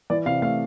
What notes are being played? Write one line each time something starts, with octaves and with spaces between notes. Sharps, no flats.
E3 D5
C3 F5
A3 F5